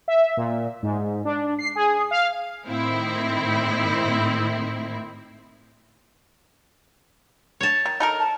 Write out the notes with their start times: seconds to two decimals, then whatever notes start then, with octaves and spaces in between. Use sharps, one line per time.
0.08 E5
0.37 A#2
0.83 G#2
1.25 D4
1.59 C7
1.76 G#4
2.11 F5
2.65 A2 D#3 C4 E4
7.61 C#5 A5
7.85 D#3
8.00 D#4 A4 A#4
8.20 A5